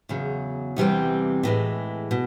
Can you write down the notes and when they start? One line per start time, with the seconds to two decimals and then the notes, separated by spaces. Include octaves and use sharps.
0.09 E2 C#3 F#3
0.76 E2 C3 E3 G3 C4
1.43 A2 E3 G#3
2.11 B2